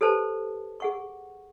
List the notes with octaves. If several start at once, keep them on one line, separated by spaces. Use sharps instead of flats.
G4 A4 B4 C5 A5
G#4 F#5 C#6